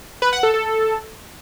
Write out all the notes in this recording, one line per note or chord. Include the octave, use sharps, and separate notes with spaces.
B4
F#5
A4
A4